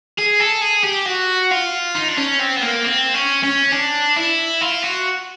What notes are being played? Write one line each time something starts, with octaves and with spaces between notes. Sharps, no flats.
G#4
A4
G#4
G4
F#4
F4
D#4
D4
C#4
C4
B3
A#3
C4
C#4
C#4
D4
E4
F4
F#4